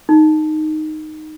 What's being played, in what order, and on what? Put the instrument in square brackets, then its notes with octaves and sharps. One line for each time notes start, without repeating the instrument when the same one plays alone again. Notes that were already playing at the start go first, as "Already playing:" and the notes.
[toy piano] D#4